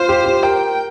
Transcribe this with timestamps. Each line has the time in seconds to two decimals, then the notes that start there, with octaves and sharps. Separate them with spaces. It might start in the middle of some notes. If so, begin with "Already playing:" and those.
Already playing: F4 C5
0.09 G4
0.26 G4
0.43 A#4 G5